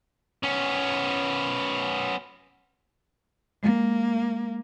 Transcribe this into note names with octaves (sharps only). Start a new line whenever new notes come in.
B3 C#4
G#3 A#3